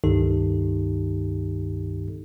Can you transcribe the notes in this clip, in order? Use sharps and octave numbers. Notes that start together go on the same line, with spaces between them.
C#2 G2 D#3 D#4 G4 A4